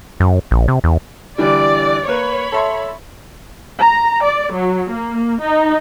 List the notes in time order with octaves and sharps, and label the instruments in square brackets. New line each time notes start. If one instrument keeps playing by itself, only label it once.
[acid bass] F#2
A#1
C3
E2
[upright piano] D3 E3 G3 [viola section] D5
[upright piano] A#3 A#4 B4 [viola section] C#5 B5
[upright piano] A4 E5 C6
[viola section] A#5
D5
F#3
A#3
D#4